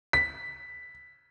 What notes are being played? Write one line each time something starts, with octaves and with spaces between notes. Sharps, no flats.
B6